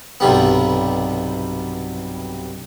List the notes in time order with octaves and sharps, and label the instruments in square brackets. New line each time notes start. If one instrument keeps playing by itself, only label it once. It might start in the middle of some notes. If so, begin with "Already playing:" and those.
[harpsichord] B1 G2 C3 G3 B3